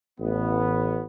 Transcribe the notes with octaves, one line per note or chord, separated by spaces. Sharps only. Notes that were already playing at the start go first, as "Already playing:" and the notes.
A1 B3